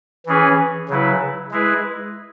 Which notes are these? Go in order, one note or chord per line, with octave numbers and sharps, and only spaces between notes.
E3 C#4 G#4 B4
C#3 F#3 E4 B4
G#3 E4 G#4 B4